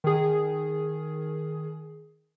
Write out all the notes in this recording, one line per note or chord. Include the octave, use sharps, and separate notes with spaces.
D#3 G#4